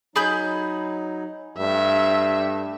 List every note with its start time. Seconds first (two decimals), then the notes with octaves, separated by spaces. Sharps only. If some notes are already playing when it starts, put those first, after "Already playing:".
0.16 F#3 D#4 G#4 B5 G6
1.58 G2 A3 E5